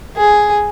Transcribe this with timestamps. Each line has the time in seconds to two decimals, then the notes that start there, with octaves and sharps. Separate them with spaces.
0.16 G#4